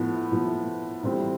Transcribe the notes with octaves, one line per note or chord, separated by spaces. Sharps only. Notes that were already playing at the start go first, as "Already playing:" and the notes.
Already playing: A2 F3 B3
A2 F3 B3
A2 E3 G3 C4